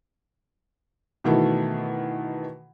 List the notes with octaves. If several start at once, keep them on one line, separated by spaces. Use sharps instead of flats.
B2 D#3 E3 A3